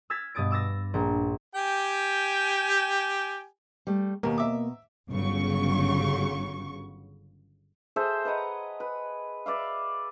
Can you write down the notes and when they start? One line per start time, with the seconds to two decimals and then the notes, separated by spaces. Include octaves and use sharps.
0.10 E6 F6 G#6 A6 B6
0.35 G2 B2 D#6 A6 D7
0.51 D6 E6 A6 A#6
0.94 A#1 A#4
1.55 G4 G5 G#5
3.87 G3 A3
4.23 D#2 B2 A#3 D#5 A#5
4.38 E5 D6
5.10 G1 C#3 F#3 C#6
7.96 G#4 A4 C5 E5
8.25 B4 D#5 F#5 A#5
8.80 B4
9.46 B4 D5 E5 F5